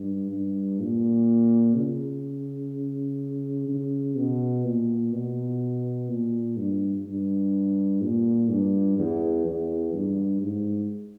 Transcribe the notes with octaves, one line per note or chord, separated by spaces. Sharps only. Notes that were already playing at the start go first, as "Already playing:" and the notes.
Already playing: G2
G2
A#2
C#3
C#3
B2
A#2
B2
A#2
G2
G2
A#2
G2
E2
E2
G2
G#2